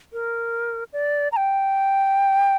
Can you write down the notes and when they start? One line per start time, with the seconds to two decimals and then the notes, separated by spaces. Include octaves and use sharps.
0.13 A#4
0.93 D5
1.32 A#5
1.37 G5